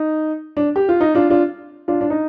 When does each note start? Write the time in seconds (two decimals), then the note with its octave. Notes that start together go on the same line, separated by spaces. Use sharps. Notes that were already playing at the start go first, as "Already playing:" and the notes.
Already playing: D#4
0.57 D4
0.76 G4
0.89 F4
1.01 D#4
1.15 D4 F4
1.30 D4 F4
1.88 D4 F4
2.01 D4
2.10 D#4